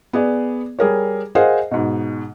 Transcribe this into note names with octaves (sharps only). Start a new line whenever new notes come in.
B3 G#4 D5
G3 G#4 A#4 C#5
G#4 A#4 C5 D#5 F5 F#5
G#2 B2